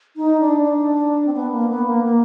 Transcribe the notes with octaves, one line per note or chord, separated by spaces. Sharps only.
D#4
D4
D4
C4
B3
A#3
B3
A#3
A#3